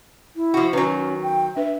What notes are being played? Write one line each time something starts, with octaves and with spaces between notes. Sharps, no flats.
E4
F3 F#4
D#3 F#3 C#4 F#4 B4
G5
D4 B4 E5